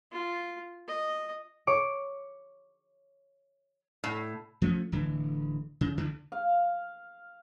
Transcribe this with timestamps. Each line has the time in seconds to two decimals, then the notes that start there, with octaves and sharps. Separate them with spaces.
0.12 F4
0.88 D#5
1.67 C#5 C#6 D6
4.04 A2
4.62 F3 A3 B3 C#4
4.92 D1 D3 E3
5.81 C#3
5.98 D2 D3
6.32 F5